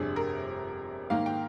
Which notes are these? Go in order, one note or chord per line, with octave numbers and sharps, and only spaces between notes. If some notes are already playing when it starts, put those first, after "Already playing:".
Already playing: G1 F2 C3 G3 D4 G#4
A#4
G#2 D#3 A#3 F5
G5